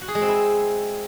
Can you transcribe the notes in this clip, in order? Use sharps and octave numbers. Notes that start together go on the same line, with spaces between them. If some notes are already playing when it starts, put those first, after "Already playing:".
F#4
G#4
G#3
C4
E4